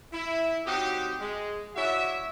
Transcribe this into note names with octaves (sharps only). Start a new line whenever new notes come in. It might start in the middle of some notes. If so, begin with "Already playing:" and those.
E4
F#3 C4 D#4 F#4 G4
G#3
E4 F#4 C#5 D5 E5